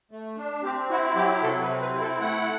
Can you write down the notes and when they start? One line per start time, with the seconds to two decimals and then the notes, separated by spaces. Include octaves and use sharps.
0.11 A3
0.37 D4
0.63 C4 G4
0.90 E4 F#4
1.15 F#3 G4
1.43 C3 A4
1.61 B4
1.68 C4
1.81 B4
1.94 E4
2.01 A4
2.21 A3 F#5